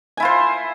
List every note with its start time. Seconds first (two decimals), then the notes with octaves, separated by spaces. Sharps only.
0.17 G#5
0.20 E4
0.22 F4
0.25 C5